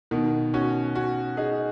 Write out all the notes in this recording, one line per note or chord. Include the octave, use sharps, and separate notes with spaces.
B2 D#3
C#4 F#4
C#4 F#4
D#4 G#4